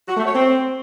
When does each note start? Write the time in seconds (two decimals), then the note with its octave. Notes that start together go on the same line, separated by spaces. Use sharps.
0.08 F#4
0.17 A3
0.26 C#5
0.34 C4